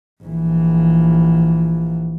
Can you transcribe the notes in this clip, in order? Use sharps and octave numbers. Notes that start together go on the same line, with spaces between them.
A#1 E3